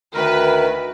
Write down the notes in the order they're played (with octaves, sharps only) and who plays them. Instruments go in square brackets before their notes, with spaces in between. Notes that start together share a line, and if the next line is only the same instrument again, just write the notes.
[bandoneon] D2 D#3 A#4 [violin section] B4